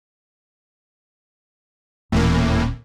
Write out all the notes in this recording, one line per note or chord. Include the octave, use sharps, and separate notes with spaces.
D#1 E2 A2 E3 A#3